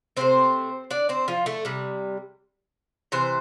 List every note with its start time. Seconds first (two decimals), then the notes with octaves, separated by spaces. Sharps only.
0.17 C3 E3 A3 C4 C5
0.91 D4 D5
1.09 C4 C5
1.28 F3 F4
1.46 A3 A4
1.65 C3 G3
3.12 C3 E3 C5